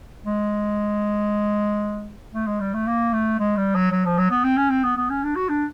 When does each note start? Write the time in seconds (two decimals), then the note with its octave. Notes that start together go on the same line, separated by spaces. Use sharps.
0.25 G#3
2.34 A3
2.47 G#3
2.60 G3
2.74 A3
2.86 A#3
3.13 A3
3.39 G#3
3.57 G3
3.75 F#3
3.91 F#3
4.05 F3
4.18 F#3
4.30 B3
4.44 C4
4.57 C#4
4.70 C4
4.83 B3
4.97 B3
5.10 C#4
5.23 D4
5.35 F#4
5.49 D4